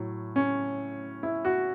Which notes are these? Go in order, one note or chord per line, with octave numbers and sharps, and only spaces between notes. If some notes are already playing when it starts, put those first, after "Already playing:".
Already playing: A2 F#3
C#4
E4
F#4